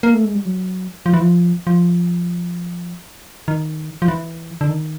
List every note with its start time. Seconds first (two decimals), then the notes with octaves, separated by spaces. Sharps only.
0.03 A#3
0.14 A3
0.24 G#3
0.35 G3
0.46 F#3
1.06 F3
1.14 E3
1.21 F3
1.67 F3
3.48 D#3
4.02 F3
4.08 E3
4.61 D3
4.69 D#3